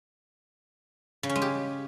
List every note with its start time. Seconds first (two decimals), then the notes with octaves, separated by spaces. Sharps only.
1.23 C#3
1.29 C#4
1.36 G#3
1.42 G4